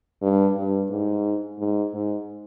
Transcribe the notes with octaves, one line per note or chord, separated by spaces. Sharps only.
G2
G2
G#2
G#2
G#2